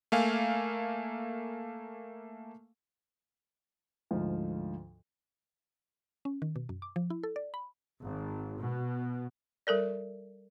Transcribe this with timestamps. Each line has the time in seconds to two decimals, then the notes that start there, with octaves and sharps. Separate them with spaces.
0.12 A3 A#3 F5 G#5
4.11 D2 G#2 F3
6.25 C#4
6.42 D#3
6.56 B2
6.69 F#2
6.82 D6
6.96 F3
7.10 E4
7.23 A4
7.36 D5
7.54 B5
8.03 G#1
8.62 B2
9.67 G3 A4 A#4 D5